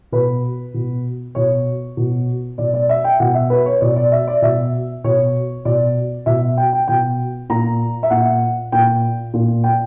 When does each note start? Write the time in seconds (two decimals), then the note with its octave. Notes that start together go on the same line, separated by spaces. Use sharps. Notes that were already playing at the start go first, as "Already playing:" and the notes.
0.12 B2 B4
0.74 B2
1.35 B2 C#5
1.97 B2
2.58 B2 D5
2.74 D5
2.89 E5
3.04 G5
3.20 B2 F#5
3.34 E5
3.50 B4
3.66 C#5
3.81 B2 D5
3.96 D5
4.12 E5
4.27 D5
4.42 B2 E5
5.04 B2 C#5
5.65 B2 D5
6.26 B2 E5
6.57 G5
6.73 G5
6.88 B2 G5
7.49 A#2 A#5
8.03 E5
8.10 A#2 F#5
8.72 A#2 G5
9.34 A#2
9.64 G5